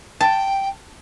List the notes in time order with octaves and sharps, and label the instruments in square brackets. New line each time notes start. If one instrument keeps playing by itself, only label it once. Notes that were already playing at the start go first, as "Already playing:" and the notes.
[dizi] G5 [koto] A5